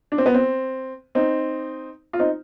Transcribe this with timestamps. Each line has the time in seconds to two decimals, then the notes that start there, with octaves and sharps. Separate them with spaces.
0.12 D4
0.18 C4
0.26 B3
0.34 C4
1.15 C4 D#4
2.13 F4
2.19 C4 D#4